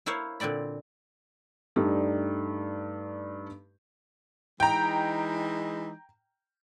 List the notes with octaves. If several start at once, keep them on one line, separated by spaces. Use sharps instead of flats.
A#3 E4 C5 C#5 F5
A#2 D3 C4 D5 B5
G2 A3 D#4 G4 D5
E3 G#3 D#4 G5 A#5